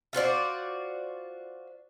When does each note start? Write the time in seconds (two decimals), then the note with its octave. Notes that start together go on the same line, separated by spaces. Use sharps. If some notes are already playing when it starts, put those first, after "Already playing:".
0.13 F4 F#4 C5 D5